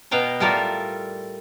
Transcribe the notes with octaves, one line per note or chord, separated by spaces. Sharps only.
B2 B3 F5 G5 A#5
A2 G3 F4 A4 A#4 D5